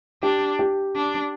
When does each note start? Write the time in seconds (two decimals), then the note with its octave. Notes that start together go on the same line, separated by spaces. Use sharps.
0.22 D4 G4
0.59 G4
0.96 D4